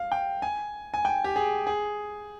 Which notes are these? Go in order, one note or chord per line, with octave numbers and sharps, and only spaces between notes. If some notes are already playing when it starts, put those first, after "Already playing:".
Already playing: F5
G5
G#5
G#5
G5
G4
G#4
G#4